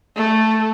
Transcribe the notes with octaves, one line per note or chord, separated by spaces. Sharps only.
A3